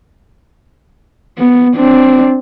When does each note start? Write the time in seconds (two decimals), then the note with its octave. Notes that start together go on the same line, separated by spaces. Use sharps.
1.38 B3
1.76 C4 D4